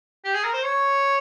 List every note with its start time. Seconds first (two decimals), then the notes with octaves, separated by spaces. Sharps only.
0.25 G4
0.34 G#4
0.44 A#4
0.54 C5
0.63 C#5